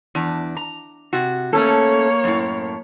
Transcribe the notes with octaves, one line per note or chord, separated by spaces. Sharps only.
E2 D4
A#5
C3 F#4
A3 A#3 C#4 A4 C#5
F#2 A2